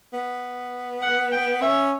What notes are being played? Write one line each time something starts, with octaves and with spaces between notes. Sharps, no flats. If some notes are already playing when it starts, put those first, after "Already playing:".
B3
F#5
G5
C#4 E5